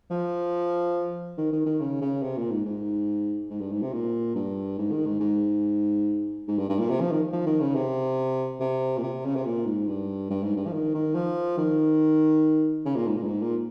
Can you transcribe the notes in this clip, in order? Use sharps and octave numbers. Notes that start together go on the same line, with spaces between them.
F3
D#3
D#3
D#3
C#3
C#3
C3
A#2
G#2
G#2
G#2
G2
G#2
C3
A#2
G2
G#2
D#3
G#2
G#2
G#2
G2
G2
A#2
C3
F3
D#3
F3
D#3
C#3
C3
C3
A#2
C3
C#3
C3
A#2
G#2
G2
G2
G#2
G2
F3
D#3
D#3
F3
D#3
C#3
A#2
G#2
A#2
G2
G#2
A#2